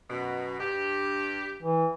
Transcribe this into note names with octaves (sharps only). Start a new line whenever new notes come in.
F#2 B2
G2 G4
E3